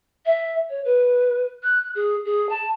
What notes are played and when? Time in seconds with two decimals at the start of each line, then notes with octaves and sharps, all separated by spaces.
0.26 E5
0.70 C#5
0.85 B4
1.63 F#6
1.95 G#4
2.25 G#4
2.49 A5